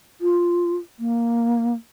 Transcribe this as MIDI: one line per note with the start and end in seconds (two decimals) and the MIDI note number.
0.21 0.76 65
0.99 1.74 58